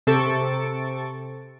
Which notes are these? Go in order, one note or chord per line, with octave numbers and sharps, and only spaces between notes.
C3 A4 C#6 A6 D7